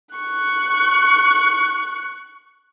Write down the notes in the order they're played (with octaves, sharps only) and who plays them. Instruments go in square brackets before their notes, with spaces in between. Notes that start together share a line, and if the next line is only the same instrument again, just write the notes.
[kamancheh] C#6 F#6